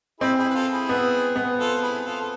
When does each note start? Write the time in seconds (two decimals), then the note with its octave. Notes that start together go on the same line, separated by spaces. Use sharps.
0.20 C4 E4 G#4
0.38 E4 G#4
0.50 B4
0.55 F4 A4
0.73 E4 G#4
0.89 B3
1.36 B3
1.59 F4 A4
1.75 F4
1.82 E4 G#4
2.05 F4 A4
2.21 A4